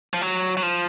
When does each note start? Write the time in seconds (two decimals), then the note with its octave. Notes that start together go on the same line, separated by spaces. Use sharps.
0.14 F3
0.21 F#3
0.57 F#3
0.63 F3